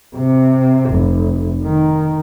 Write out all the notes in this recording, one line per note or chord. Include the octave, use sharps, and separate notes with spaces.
C3
F1
D#3